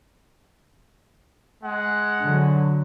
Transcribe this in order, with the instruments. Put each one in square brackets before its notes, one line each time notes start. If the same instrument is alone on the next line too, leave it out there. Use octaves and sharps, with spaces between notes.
[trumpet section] G#3 F#5
[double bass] D3 F#3